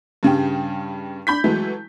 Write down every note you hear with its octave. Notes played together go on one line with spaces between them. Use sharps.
G2 C#3 G3 G5
D4 B5 G6 B6
E3 F#3 G#3 A3